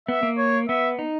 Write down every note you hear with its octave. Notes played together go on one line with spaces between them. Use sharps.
B3 E5
A#3
C#5
B3 E5
D#4